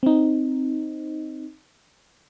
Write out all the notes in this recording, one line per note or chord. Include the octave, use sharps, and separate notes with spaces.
C4 D#4